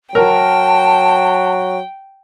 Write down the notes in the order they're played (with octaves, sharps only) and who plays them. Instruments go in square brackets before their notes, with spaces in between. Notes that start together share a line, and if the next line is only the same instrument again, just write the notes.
[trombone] F#3 [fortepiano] A#4 [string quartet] G5 [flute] A5